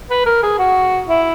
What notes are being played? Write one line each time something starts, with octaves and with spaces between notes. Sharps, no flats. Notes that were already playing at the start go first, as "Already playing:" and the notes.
B4
A#4
G#4
F#4
E4